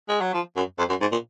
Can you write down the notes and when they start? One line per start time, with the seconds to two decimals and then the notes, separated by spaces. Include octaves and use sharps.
0.08 G#3
0.21 F#3
0.34 F3
0.56 F#2
0.79 F2
0.90 F#2
1.01 G#2
1.12 A#2